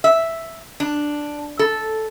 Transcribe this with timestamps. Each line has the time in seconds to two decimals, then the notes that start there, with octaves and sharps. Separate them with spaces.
0.04 E5
0.80 D4
1.59 A4